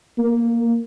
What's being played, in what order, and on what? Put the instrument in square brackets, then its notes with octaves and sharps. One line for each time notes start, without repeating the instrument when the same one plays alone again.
[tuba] A#3